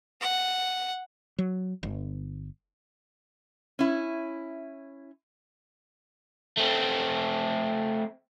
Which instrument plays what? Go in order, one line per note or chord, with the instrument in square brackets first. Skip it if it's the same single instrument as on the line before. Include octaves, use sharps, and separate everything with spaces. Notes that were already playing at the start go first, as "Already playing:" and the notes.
[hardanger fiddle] F#5
[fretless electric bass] F#3
G1
[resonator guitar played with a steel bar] C#4 E4
[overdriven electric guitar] A3 C4